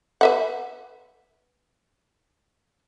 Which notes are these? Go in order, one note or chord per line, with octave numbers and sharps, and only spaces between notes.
B4 E5 F#5